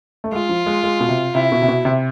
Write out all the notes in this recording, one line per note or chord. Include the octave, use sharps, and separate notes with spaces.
A3
G#3 F4
F3
G#3
G#3
B2
C3
C3 E4
B2
C3
B2
C3